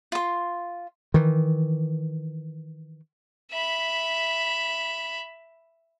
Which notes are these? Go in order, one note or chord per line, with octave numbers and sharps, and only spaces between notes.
F4 C6
D#3 E3
E5 B5